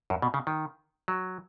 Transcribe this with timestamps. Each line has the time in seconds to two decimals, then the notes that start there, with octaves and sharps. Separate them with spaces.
0.10 F#2
0.22 B2
0.34 C#3
0.47 D#3
1.08 F#3